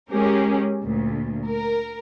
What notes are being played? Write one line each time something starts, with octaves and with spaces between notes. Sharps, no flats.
G#3 C#4 G4 G#4 A#4
D2 A#2
A#4